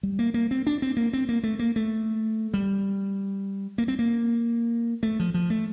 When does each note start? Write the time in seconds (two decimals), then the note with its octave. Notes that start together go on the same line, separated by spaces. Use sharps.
0.03 G3
0.19 A#3
0.34 A#3
0.51 C4
0.67 D4
0.82 C4
0.97 A#3
1.13 C4
1.29 A#3
1.43 A3
1.59 A#3
1.76 A3
2.54 G3
3.78 A#3
3.88 C4
3.99 A#3
5.03 A3
5.20 F3
5.34 F3
5.50 A3